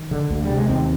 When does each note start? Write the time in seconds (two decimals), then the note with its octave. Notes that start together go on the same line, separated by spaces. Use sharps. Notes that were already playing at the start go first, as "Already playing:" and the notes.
Already playing: D#3
0.11 D3
0.30 D2
0.44 G3
0.50 C3
0.57 G#3
0.69 D#2 C4